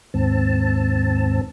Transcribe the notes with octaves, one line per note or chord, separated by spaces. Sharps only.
D#2 G#2 C4 A5